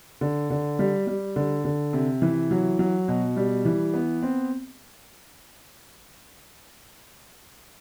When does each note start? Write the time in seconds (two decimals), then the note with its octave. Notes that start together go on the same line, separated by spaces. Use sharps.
0.21 D3
0.50 D3
0.79 G3
1.07 G3
1.36 D3
1.65 D3
1.93 C3
2.22 E3
2.51 F#3
2.79 F#3
3.08 B2
3.36 G3
3.65 E3
3.94 B3
4.22 C4